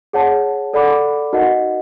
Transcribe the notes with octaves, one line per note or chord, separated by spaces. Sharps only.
G#4 C#5 F#5 A5
A4 D5 F#5 B5 D6
D#4 F#4 A#4 D#5 F#5